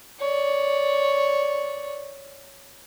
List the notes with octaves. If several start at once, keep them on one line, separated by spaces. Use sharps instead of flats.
C#5 D5